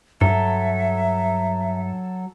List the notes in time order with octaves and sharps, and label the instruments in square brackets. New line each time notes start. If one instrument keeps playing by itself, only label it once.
[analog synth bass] G2 [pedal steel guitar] F#3 A4 [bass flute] E5